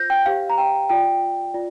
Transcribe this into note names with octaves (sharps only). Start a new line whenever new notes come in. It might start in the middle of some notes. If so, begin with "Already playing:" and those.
Already playing: F4 C5 G6 A#6
G5
G4 C5 F5
A#5
G5
F4 D5 G5
F4 D5